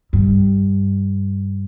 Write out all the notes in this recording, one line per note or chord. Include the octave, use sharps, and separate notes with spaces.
G2